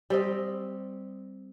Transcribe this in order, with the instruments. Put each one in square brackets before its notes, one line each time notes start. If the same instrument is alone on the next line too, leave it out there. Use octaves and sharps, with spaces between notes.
[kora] G3 C4 D#5